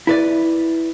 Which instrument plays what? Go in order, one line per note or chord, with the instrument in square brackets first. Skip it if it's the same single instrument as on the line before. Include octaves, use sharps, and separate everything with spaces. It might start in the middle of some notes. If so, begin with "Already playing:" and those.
[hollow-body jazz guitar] E4 B4 D5